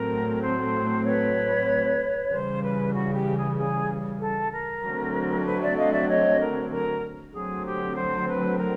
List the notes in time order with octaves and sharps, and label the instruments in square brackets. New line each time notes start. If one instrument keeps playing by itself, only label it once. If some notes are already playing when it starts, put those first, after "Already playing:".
Already playing: [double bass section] A2 F#3 A3 C4 [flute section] A#4
[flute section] C5
B4 C#5
[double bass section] C#3 E3 G3 [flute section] C5
[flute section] B4
F#4
G4
G#4
G#4
A4
A#4
[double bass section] D3 F#3 A3 C4
[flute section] B4
D5 E5
D#5 F5
D5 E5
C#5 D#5
A#4
A#4
[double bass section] D3 F#3 A3 C4 [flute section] G#4
[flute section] G4
C5
B4
A#4